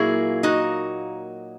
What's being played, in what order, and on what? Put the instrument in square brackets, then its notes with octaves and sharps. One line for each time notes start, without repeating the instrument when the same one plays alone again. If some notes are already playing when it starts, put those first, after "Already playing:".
Already playing: [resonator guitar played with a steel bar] A#2 F#3 A#3 E4 G#4
D#4 F#4